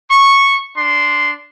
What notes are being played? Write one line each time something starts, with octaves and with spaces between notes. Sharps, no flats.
C#6
D4 C6